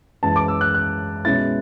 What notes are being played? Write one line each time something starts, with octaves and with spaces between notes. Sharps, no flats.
F#2 E3 G#3 A5
D6
E6
F#6
F#6
B2 G#3 C#4 E4 A6